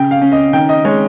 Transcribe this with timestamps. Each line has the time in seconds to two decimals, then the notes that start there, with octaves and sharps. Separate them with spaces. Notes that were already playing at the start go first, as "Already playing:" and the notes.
Already playing: C#3 G5
0.11 F5
0.21 C#4
0.32 D#5
0.53 D#3 G5
0.69 D#5
0.85 G#3 C#5